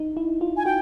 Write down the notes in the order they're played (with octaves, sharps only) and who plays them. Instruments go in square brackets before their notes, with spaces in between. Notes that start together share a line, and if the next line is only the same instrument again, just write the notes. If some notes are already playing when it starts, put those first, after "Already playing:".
Already playing: [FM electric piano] D#4
E4
F4
[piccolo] G#5
[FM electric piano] F#4 [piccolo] G5